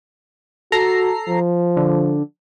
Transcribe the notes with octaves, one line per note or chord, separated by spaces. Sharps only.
F#4 A4 A#5 C7
F3
D3